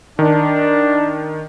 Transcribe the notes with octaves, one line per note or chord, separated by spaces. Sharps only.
D#3 D4